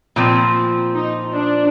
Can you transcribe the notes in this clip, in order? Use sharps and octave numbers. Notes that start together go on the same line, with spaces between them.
A#2 F3 C4
D#4
D4